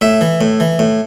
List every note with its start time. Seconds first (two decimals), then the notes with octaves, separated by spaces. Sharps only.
0.01 A2 E5
0.21 E3
0.41 A2
0.60 E3
0.79 A2